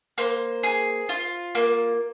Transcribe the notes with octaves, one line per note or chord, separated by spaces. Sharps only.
A#3 C5
G#4
F4
A#3